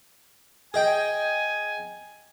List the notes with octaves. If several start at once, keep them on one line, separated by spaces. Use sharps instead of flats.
G#4 D#5 G5 G#5